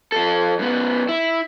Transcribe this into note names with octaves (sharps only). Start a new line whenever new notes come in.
F3 A4
F#2 B3
E4